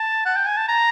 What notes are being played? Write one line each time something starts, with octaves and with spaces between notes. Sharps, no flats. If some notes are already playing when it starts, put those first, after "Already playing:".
Already playing: A5
F#5
G5
G#5
A5
A#5